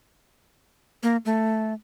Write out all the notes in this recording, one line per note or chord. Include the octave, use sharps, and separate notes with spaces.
A#3
A3